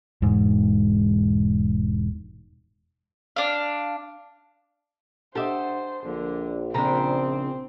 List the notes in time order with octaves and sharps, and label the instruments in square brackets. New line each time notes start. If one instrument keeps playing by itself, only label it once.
[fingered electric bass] E1 G#2
[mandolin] D4 F5
[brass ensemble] D4 F#5 [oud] G4 E5 [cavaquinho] A4 D#5 D6 [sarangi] C5
[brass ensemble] A#1 [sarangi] D3
[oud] C#3 F3 D4 [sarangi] C4 [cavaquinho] A4 A#5 B5